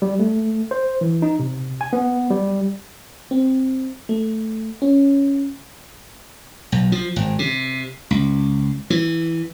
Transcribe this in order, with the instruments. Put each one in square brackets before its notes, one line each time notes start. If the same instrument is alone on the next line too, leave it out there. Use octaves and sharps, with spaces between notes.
[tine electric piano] G3
A3
C5
E3
D#4
C3
G#5
B3
G3
[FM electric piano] C4
A3
C#4
[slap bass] B1
F3
G#1
C3
C#2
E3